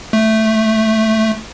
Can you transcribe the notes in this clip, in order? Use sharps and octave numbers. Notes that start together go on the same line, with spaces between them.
A3